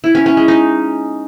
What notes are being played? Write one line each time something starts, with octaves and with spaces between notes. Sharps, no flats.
E4
C#4
C#4
G#3
D#4